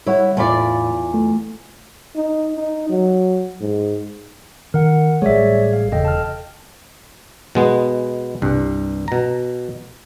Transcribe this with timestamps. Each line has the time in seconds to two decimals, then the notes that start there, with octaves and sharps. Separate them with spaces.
0.06 G3 E4 C#5 F#5
0.37 E2 A2 F4 D5 F5 B5
1.14 A3
2.15 D#4
2.55 D#4
2.90 F#3
3.60 G#2
4.74 D#3 A#4 F#5
5.22 A1 G3 G#3 G#4 C#5 D5 E5
5.73 F5
5.92 E1 C#3 A4 D#5 G5
6.05 A5 F6
7.55 B2 G#3 B3
8.42 C2 G2
9.08 B2 A#5